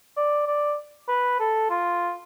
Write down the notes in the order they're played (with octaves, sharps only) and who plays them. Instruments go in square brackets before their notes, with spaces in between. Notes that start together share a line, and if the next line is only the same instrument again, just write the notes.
[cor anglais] D5
D5
B4
A4
F4